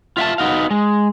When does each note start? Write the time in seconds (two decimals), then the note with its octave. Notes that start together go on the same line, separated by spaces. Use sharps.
0.17 F4 E5 F5 A5
0.38 B3 D#4 F#4 F5
0.71 G#3